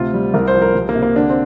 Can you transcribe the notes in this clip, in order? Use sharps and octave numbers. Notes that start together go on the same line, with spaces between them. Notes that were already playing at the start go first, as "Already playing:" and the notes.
Already playing: D2 C3 F4
G3
C2 A#4
C5
F3
A#4
C2
A#3
C3
A#3
D3 D4
C4